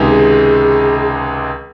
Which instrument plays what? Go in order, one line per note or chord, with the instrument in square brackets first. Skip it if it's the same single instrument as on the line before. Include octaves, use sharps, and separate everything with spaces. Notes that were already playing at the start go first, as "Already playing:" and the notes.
Already playing: [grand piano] C#2 C3 D#3 G#3
[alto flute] G#4